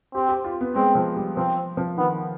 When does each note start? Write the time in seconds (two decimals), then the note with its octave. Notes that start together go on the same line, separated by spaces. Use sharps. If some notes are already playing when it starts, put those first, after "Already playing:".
0.14 C4 G4
0.29 G4
0.44 F4
0.61 B3
0.76 G#3 C4
0.95 F3
1.17 G3
1.37 F3 C4
1.77 F3
1.98 D#3 B3